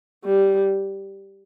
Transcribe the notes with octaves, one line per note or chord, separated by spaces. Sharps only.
G3